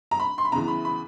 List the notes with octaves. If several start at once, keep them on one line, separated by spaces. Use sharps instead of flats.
A#5
B5
C6
B5
E2 C#3 E3 A#5
B5
B5